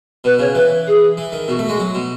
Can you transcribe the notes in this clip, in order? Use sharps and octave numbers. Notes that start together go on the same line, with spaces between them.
B2 B4
C#3 C#5
E3 B4
G#4
E3
D#3
B2 F#4
A3
G#3 F#4
F#3
B2